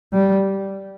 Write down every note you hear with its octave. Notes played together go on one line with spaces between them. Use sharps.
G3